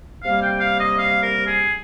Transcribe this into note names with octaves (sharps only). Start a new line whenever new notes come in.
C3 G3 A#3 F5
G5
F5
D#5
F5
A#4
G#4